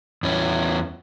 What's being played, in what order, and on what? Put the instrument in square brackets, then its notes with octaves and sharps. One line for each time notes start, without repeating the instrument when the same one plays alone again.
[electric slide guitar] E2 C#4